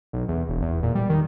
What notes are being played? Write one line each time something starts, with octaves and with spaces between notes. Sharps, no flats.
B1
E2
E1
E2
A#2
G3
D#3